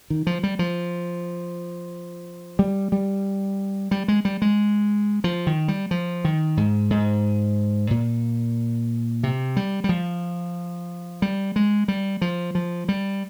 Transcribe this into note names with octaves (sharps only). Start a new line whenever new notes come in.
D#3
F3
G3
F3
G3
G3
G3
G#3
G3
G#3
F3
D#3
G3
F3
D#3
G#2
G#2
A#2
C3
G3
G3
F3
G3
G#3
G3
F3
F3
G3